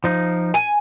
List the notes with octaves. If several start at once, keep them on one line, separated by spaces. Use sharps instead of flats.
F3 D#4
G#5